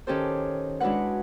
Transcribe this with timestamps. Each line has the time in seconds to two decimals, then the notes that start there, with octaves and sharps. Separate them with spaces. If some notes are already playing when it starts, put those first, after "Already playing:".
0.07 D#3 C#4 G4 A4 C5
0.80 G#3 D4 E4 F#4 B4 F#5